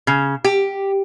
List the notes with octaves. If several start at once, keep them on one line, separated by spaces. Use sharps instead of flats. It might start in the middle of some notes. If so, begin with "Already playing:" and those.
C#3
G4